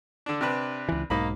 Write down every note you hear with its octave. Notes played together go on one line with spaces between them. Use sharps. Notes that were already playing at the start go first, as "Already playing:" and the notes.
D3 D4
C3 D4 B4
C#2 E3
B1 G#2 A#3 D#4 B5